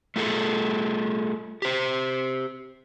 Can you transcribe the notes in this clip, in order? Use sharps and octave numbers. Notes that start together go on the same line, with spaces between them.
A3 F4 G#4 A4
G4 C5